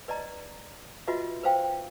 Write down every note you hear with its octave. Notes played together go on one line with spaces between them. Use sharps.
B4 D5 D#5 A#5
F4 F#4 B4 D#5 E5
B4 C5 F5 G5